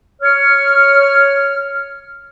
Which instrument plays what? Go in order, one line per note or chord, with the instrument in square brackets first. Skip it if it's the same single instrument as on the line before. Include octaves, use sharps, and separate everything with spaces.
[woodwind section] C#5 F6